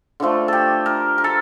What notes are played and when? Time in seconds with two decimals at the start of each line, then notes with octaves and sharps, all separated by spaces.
0.20 D3 F3 A3
0.48 G4 A4
0.86 A#4
1.18 A#4
1.24 A4